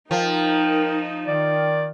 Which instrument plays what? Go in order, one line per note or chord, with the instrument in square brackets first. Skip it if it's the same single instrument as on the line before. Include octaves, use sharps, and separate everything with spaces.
[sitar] F3 [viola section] D#4 [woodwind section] A#4 G5
[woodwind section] D#3 [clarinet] D5